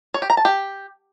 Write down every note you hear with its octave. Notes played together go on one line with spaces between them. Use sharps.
C#5
G4
A#5
A5
G4